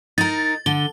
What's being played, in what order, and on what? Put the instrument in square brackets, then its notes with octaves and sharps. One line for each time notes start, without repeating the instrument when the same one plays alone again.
[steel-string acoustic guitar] D#4 A#4 [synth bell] A6
[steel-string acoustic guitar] D3 [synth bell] G7